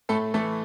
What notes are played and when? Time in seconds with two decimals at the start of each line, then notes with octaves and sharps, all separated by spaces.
0.09 A2 A3 A4
0.34 E3 A3 A4